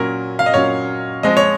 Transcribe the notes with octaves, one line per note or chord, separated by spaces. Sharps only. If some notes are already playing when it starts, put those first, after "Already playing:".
Already playing: A#2 F#3 C#4 A#4
F5
D#5
A#2 F#3 C#4 C#5
F3 G#3 C4 D#5
C#5